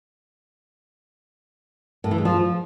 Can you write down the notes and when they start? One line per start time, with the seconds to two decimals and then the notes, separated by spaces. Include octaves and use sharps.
2.04 A2
2.11 E3
2.18 G#3
2.25 F3